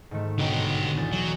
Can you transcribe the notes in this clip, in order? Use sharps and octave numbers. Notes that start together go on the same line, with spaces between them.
G#2 D#3 A3
B1 B2 D3 G4
E2 G6 A6
F#3